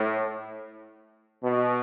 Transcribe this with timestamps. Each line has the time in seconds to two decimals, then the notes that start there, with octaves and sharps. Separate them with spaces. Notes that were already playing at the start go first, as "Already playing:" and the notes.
Already playing: A2
1.42 B2